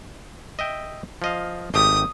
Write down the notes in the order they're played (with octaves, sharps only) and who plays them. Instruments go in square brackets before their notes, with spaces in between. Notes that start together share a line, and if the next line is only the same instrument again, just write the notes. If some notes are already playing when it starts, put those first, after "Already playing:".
[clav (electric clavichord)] D#5 E5 G5
F3 D#5 F5
[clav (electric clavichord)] G#1 A3 G4 [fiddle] D#6